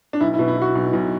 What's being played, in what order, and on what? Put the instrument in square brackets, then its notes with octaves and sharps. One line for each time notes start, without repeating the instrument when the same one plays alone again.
[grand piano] D4
B1 E4
E4
B2
E4
B2 F#4
B1
B1